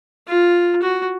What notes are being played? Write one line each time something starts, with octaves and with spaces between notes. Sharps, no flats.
F4
F#4